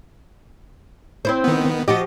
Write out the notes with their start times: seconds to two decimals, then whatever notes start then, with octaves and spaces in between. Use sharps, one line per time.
1.25 C4 E4 C5
1.44 D#3 B3
1.88 F3 F#4 G4 D#5